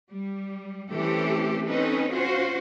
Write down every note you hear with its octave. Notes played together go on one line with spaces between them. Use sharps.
G3
E3 A3 C4 C#4 G4 A4
C4 C#4 D#4 A4 B4
C#4 F4 F#4 C5